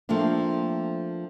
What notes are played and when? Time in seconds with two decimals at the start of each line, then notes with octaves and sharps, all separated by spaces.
0.09 F3 A3 A#3 C4 D4